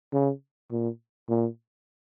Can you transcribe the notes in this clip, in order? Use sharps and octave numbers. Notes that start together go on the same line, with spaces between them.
C#3
A#2
A#2